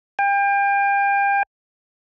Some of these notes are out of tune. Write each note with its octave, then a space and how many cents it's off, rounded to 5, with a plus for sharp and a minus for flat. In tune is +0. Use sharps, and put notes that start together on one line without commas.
G5 +35